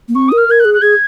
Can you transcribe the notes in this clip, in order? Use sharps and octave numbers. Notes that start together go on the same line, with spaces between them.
A#3
C4 C#6
D#6
A#4
F6
A#4 G#6
F#6
G#4
F#6
G#4 G#6